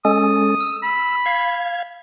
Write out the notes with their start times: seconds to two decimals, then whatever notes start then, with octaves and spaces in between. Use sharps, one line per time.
0.05 G#3 C#4 A4 D#6
0.61 E6
0.83 B5
1.26 F5 G#6